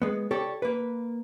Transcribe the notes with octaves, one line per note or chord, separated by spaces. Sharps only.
G#3 B3
G4 A4 C#5 D5
A#3 B4